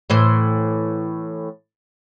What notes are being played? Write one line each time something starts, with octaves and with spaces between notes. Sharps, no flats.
A2 E3 C5